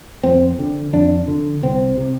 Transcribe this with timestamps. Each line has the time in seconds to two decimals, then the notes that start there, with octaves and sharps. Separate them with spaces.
0.24 F2 C4
0.59 D3
0.93 F2 D4
1.28 D3
1.62 C2 C4
1.97 C3